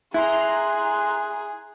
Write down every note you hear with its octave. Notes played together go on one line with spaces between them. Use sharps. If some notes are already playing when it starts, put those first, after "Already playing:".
E4 G#4 A#5 C6 F#6